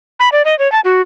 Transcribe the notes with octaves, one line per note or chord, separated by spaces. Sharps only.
B5
D5
D#5
C#5
A5
F#4